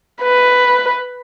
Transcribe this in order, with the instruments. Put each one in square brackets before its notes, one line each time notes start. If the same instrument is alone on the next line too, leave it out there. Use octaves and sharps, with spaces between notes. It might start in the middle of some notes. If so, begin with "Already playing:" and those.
[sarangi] B4